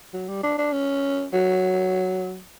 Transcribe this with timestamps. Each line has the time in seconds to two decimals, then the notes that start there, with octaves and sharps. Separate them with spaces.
0.14 F#3
0.28 G3
0.43 D4
0.58 D4
0.73 C#4
1.33 F#3